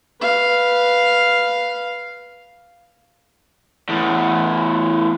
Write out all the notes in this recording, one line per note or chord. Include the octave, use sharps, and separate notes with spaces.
B4 F5
E2 A2